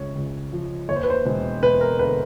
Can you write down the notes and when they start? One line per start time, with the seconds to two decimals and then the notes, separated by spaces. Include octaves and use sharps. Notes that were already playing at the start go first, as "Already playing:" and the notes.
Already playing: C#2 C#3 C#5
0.15 C#2
0.53 F3
0.89 D#2 C#5
0.96 C5
1.03 B4
1.10 C5
1.25 E1
1.63 E1 B4
1.81 A#4
1.99 D3 B4